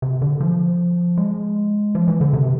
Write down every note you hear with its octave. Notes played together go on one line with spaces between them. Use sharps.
C3
D3
F3
G#3
F3
E3
D3
C3